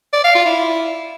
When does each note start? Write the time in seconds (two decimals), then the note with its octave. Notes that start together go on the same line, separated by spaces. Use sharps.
0.13 D5
0.24 F5
0.35 F4
0.46 E4